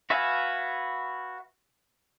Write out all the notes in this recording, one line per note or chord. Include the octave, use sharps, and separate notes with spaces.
F#4 B4 E5 F5 G#5